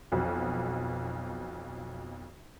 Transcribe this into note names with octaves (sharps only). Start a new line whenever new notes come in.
B1 F2 B2